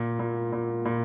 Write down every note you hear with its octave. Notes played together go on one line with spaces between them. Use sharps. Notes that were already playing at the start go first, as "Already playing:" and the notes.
Already playing: A#2
A#2
A#2
A#2